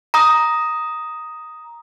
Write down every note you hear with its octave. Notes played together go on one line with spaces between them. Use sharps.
A#5 D#6